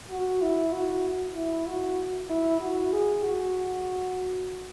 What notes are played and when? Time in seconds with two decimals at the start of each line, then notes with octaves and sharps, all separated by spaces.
0.10 F#4
0.41 E4
0.73 F#4
1.36 E4
1.67 F#4
2.30 E4
2.60 F#4
2.92 G#4
3.23 F#4